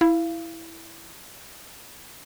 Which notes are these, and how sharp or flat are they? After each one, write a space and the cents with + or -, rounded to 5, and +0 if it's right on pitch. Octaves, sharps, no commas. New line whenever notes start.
E4 +0 F5 -25